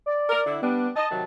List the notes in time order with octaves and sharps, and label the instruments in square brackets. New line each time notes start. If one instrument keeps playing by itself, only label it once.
[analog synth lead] D5
[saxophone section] A#4
D3 E4
[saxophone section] G3 D4 [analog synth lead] B3
[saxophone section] D#5 [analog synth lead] A5
[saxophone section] C3 D#3 F#3